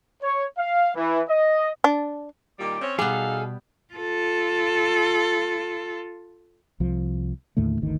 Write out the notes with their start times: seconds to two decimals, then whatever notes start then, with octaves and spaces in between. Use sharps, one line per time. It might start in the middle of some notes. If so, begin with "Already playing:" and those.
0.23 C#5
0.58 F5
0.96 E3
1.29 D#5
1.84 D4
2.59 A#2 D#3 G3 D6
2.81 C4 C#4 C#5
2.99 B2 G3 B3 D#4 G#4 A4 F5
3.94 F4 A4
6.80 C2 F3
7.57 D#2 A2 D3 A3
7.81 G1 D2 D#3